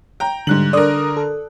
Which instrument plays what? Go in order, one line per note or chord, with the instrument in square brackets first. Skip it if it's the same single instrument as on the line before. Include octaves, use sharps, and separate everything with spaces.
[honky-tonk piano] G5 A#5
[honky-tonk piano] G#2 F#6 F#7 [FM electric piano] D3 G3
[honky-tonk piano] D3 A#4 [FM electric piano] D5 D#6
[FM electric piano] A4